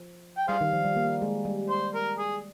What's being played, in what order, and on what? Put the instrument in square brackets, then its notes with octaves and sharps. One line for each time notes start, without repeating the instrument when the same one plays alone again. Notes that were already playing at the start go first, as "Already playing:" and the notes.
Already playing: [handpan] F3
[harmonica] G5
[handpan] G3 [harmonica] G#4 C5 F5
[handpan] D#3
F3
G3
A#3
G#3
G3
[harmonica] C5
A#4
G#4